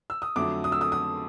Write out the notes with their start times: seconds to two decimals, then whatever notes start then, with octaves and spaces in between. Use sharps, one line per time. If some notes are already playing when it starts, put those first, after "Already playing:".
0.10 E6
0.22 D#6
0.36 F2 D3 F#3 A3 D6
0.64 D#6
0.72 E6
0.81 D#6
0.92 D#6